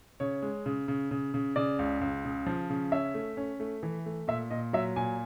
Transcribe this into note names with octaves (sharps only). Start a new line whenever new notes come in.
C#3 C#5
G#3
C#3
C#3
C#3
C#3
C#3 D5
C#2
C#2
C#3
F3
C#3
C#4 E5
A3
C#4
A3
E3
A3
A#2 E5
A#2 D#5
F#3 E5
A#2 G#5